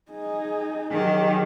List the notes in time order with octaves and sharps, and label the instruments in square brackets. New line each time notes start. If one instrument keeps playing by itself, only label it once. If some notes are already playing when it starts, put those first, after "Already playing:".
[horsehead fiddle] D#4 G#4
[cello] D#3 F#3 [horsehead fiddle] G4 G#4